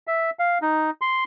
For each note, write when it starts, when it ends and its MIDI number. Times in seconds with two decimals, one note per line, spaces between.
0.07 0.30 76
0.39 0.58 77
0.62 0.90 63
1.01 1.24 84